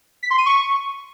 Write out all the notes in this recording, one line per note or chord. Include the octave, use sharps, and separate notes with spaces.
B6
C6
D#7
C#6